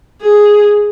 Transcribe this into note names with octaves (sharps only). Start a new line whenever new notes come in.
G#4